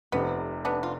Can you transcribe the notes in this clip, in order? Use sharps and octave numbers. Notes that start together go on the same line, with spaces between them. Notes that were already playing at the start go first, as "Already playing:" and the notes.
F1 F2 C3 B3
B3 D4
F4